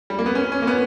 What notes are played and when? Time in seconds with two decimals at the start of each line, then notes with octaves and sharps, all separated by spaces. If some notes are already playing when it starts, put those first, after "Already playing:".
0.10 G3
0.19 A#3
0.26 B3
0.35 C#4
0.52 C#4
0.62 A#3
0.67 B3